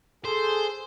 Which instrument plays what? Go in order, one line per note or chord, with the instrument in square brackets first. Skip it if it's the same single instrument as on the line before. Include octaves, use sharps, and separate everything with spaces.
[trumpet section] G#4 A4 [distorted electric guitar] C5